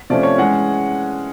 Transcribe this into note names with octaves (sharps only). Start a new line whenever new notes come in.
C3 F3 A3 C#4 D5
C#5
E3 G#3 C#4 F#5